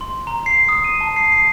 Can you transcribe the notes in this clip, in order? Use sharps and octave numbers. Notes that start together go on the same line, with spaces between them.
C6
A#5
C7
D#6
D#7
A5
C7
C7